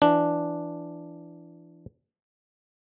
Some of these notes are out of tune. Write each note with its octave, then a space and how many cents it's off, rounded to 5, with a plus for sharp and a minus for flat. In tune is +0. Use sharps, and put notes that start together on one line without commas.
E3 +25 D4 +0